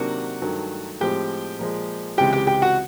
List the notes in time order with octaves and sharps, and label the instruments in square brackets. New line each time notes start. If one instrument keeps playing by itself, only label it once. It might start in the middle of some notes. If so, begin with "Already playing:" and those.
Already playing: [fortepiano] C3 D#3 F#3 A#3 D4 F#4 F#5
G2 D#3 F#3 A3
A2 F3 G#3 C4 G4 G5
A#2 F3 G#3
C#2 C3 E3 G#3 G4 G5
G4 G5
G4 G5
F#4 F#5